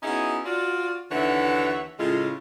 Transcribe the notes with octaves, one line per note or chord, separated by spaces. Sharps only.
B3 C#4 D#4 E4 F#4 G#4
F4 F#4 D5
D#2 D3 E3 C#5 E5 F#5
A2 C#3 G#3 A3 C#4 F4